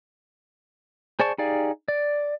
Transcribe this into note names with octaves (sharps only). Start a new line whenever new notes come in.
G#4 C5 D5 A5 C#6
D#4 G4 G#4 D5 F5
D5